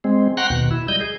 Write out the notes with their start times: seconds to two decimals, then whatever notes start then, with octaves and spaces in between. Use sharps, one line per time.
0.04 G#3 C4
0.37 F#5 G5 A#5 C6 C#6 F#6
0.50 D#2 B2
0.71 E4
0.88 G3 D#5 G6
1.01 G#4